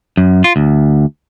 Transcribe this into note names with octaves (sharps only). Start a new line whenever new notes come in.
F#2
F4
D2